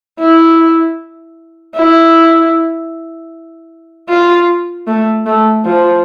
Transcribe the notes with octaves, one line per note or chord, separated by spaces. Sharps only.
E4
E4
F4
A3
A3
F3